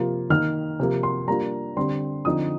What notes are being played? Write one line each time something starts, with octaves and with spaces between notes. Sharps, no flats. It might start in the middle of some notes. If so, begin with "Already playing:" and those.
Already playing: C3 F3 A#3 F4
D#3 A#3 D#4 F6
C3 F3 A#3
C6
G3 A#3 D4 F4 A#5
D3 G3 C4 C6
D3 F3 C4 D#4 D#6